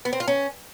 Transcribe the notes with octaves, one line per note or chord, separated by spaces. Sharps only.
B3
C4
F4
C#4